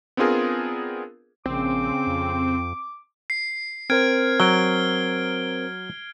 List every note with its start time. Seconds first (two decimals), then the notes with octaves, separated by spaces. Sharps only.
0.17 B3 C4 D4 F4 G#4 A#4
1.46 A#1 C#3 C4 D6
2.07 F2
3.30 C7
3.90 C4 A#4 C5 F6 G#6 D7
4.40 F#3 D7 G7